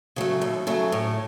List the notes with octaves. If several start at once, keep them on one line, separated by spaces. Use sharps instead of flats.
C#3 F#3 A3
D#2
C#3 F#3 A3
A2